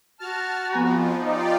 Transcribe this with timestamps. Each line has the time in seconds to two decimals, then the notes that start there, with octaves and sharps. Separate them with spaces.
0.20 F#4 A5 F6
0.72 F2 F3 B3 G#5 A#5
1.18 D#4 F4 G4 D5